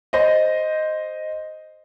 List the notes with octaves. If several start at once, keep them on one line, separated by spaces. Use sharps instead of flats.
C5 D#5